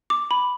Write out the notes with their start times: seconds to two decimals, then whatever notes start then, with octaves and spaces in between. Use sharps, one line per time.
0.10 D6
0.31 B5